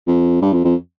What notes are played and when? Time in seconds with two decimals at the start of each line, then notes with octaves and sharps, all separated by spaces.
0.07 F2
0.42 G2
0.53 F2
0.64 F2